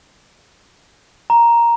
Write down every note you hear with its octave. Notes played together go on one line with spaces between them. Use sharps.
A#5